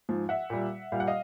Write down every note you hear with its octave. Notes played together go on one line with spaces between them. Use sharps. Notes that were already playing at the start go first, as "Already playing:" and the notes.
G#2 F3
E5 F#5
A#2 G3
A#2 G3 F5
F#5
D#5 F5